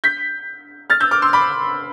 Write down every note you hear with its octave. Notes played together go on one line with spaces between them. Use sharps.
G6 B6
F6 A6
E6 G6
D6 F6
C6 E6
B5 D6